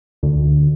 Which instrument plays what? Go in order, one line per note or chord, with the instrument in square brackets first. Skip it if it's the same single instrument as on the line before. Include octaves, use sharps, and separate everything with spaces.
[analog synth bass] D2